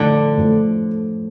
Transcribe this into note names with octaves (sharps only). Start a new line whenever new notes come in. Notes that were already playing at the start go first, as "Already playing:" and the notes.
Already playing: A2 D3 F3 A3
A2 F3 A3